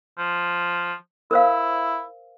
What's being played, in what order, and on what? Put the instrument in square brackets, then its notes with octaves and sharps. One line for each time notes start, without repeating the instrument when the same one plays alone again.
[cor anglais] F3
[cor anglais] E4 [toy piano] A#4 C5 F5